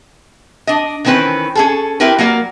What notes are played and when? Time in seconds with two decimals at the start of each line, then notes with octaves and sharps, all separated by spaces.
0.67 D4 D#5
1.05 D#3 E3 C4 C#4 B4
1.55 C#4 G#4 A4
2.00 C4 E4 G4 A#4 B4
2.19 F#3 A#3 A#4 D5